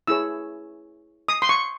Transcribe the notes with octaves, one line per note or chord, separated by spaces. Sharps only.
E4 G#4 C#5 E6
D#6
C6
C#6